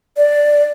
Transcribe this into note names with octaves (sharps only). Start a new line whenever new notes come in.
D5